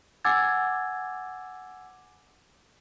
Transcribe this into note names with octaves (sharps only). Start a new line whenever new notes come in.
F#5 G#5 D6 E6 G#6 A6